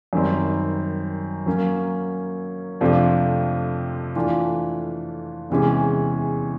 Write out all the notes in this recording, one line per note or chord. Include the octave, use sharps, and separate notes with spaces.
F#2 D#3 G3 C4
F#3 A#3 C#4
F2 C3 F3 A3 D4
E3 A3 D4 F4
E2 C3 E3 G#3 C#4